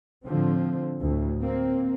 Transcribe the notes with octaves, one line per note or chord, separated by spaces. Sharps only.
A2 D3 F3 C4
D2 A2
A#3 C4